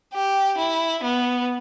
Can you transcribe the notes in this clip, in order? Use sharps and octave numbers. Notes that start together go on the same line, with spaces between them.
G4
E4
B3